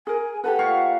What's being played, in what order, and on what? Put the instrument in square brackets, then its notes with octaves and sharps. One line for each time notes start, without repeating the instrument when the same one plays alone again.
[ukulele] G#4 A#4 [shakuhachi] G#5
[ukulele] G4 A4 B4 [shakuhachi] F#5
[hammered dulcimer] A#2 F5 C#6